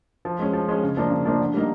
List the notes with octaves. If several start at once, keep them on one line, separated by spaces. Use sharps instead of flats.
F3
G#3 C#4
F3
G#3 C#4
C#3
F3 A#3 D4
C#3
F3 A#3 D4
D3
G3 A#3 D#4